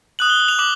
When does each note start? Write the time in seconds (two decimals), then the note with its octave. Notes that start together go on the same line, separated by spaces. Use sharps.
0.19 D#6 F#6 F#7
0.29 G7
0.40 F#7
0.48 F7
0.59 D6 F#7